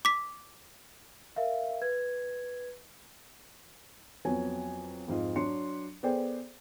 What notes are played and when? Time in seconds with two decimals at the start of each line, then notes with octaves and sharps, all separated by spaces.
0.05 D6 B6
1.36 A#4 E5 F5
1.81 B4 G#6
4.25 F2 F#3 B3 G#5
5.08 F2 G#2 F4 D#5
5.36 F#3 D4 C6 C#7
6.03 B3 G#4 A4 C5 D5 G5